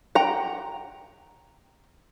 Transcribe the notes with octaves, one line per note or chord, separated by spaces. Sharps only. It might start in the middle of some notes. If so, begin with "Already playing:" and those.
F#5 G5 A#5